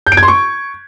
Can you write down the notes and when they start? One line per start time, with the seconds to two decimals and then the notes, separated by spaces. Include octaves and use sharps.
0.07 G6
0.12 D7
0.17 G#6
0.23 C6
0.28 C#6